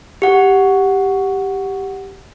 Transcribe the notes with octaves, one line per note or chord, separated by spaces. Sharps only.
G4 F#5